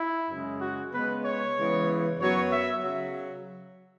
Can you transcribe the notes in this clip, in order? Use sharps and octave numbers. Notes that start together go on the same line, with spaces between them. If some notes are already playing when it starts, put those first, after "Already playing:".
Already playing: E4
F#2 C#3 G#3
F#4
C#3 G#3 B3 B4
C#5
C#3 E3 G#3 B3
F#2 F#3 B3 C#5
E5
C#3 F#3